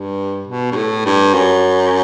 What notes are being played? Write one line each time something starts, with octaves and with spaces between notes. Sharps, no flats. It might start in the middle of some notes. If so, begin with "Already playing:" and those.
Already playing: G2
B2
G2
A2
G2
F#2